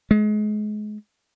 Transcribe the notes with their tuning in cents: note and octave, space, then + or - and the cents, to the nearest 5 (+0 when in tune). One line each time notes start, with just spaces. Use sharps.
G#3 +30